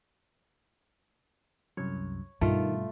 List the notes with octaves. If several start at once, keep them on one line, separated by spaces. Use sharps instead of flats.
C2 F#2 C#5
G2 B2 D#3 A3 F4